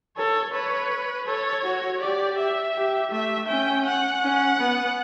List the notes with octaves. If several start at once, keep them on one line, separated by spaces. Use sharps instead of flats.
A4 C#5
B4 C#5
A4 C#5
F#4
G4 D5
E5
G4
A3 E5
C#4 G5
F#5
C#4
B3